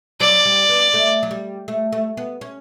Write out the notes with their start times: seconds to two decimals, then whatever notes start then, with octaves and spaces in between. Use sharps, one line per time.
0.20 F#3 D5
0.45 G3
0.69 B3
0.94 A3
1.23 F#3
1.31 G3
1.68 A3
1.92 A3
2.17 B3
2.41 C#4